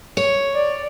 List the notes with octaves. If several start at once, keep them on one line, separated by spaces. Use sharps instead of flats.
C#5
D5